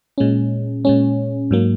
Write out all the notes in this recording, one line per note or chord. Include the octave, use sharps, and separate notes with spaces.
A#2 G#3 C#4
A#2 G#3 C#4
G#2 F#3 A#3